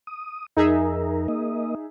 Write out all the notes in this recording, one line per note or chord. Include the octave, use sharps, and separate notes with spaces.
D#6
F2 D#4 G#4 A#4 E5
A#3 D#5